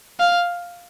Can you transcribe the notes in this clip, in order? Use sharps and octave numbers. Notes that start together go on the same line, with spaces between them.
F5